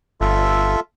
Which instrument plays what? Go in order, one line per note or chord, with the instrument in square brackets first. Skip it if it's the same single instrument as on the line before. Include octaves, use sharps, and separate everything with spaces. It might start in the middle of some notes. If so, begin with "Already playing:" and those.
[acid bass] G1 [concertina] F4 A4 E5